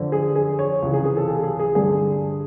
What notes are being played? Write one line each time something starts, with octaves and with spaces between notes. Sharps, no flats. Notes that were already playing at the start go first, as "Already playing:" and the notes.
Already playing: F2 D3
G#4
G#4
C#5
C#2 C3 E3
G#4
G#4
A4
G#4
G#4
G#4
G2 D3 G#4